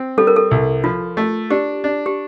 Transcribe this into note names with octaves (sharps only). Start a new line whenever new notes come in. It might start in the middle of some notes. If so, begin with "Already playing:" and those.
Already playing: C4
G3 A4
A#4
A4
C2
F3 F4
A3
D4 G4
D4
G4